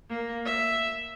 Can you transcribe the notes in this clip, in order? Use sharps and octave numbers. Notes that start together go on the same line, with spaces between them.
A#3
E5